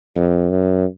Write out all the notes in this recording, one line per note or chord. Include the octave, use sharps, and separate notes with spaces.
F2
F#2